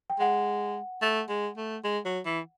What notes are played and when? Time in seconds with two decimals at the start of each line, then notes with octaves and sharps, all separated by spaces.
0.10 G5
0.19 G#3 F#5
1.02 A3
1.29 G#3
1.57 A3
1.84 G#3
2.05 F#3
2.25 E3